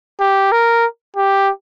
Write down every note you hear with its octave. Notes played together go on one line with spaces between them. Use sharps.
G4
A#4
G4